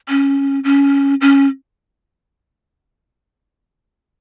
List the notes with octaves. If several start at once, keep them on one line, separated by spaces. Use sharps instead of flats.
C#4
C#4
C#4